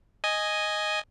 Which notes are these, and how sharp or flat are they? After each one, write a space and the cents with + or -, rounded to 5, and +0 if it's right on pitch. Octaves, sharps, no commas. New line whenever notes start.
D#5 +0 G#5 +0